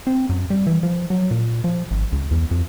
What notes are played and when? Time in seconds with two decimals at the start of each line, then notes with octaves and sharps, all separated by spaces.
0.07 C4
0.29 F#2
0.50 G3
0.67 E3
0.83 F3
1.10 F#3
1.31 A#2
1.64 F3
1.91 G#1
2.12 C#2
2.31 E2
2.51 F2